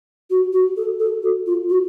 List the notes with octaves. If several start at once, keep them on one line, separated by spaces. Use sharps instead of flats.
F#4
F#4
A4
A4
F#4
F4
F#4